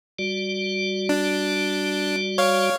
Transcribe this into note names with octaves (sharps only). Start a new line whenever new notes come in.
G3 F#4 D5
D4
C#5 F5